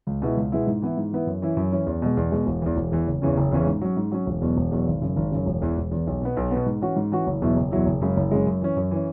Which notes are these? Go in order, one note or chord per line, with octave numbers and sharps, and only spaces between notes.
C#2
B2 G#3 B3 E4
C#2
B2 G#3 B3 E4
G#2
E3 B3 E4
G#2
E3 B3 E4
F#2
E3 C#4 E4
F#2
E3 C#4 E4
E2
B2 G#3
E2
B2 G#3
E1
E2 E3
E1
E2 E3
F#1
E2 C#3 E3 C#4
F#1
E2 C#3 E3 C#4
G#2
F#3 C#4
G#2
F#3 C#4
E1
E2 B2 F#3
E1
E2 B2 F#3
G#1
F#2 C#3
G#1
F#2 C#3
E1
E2 E3
E1
E2 E3
B1
B2 B3
B1
B2 B3
G#2
E3 C#4 F#4
G#2
E3 C#4 F#4
F#1
E2 B2 F#3 E4
F#1
E2 B2 F#3 E4
F#1
F#2 C#3 G#3
F#1
F#2 C#3 G#3
F#2
E3 C#4
F#2
E3 C#4